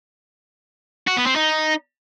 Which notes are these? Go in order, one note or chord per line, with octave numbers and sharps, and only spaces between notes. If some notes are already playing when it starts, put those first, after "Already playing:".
F#4
B3
C4
D#4